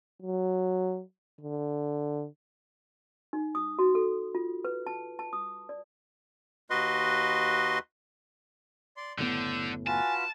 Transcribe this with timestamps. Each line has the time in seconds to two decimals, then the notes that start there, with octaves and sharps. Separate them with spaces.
0.22 F#3
1.41 D3
3.33 D#4
3.55 D#6
3.79 F#4
3.95 A4
4.35 F4
4.65 B4
4.87 A5
5.19 A5
5.33 D#6
5.69 D5
6.70 D#2 F#4 B4 D#5 C6
8.97 D5 C6
9.19 F#1 A2 D3 B3 G6
9.87 F4 F#4 B4 G#5 A5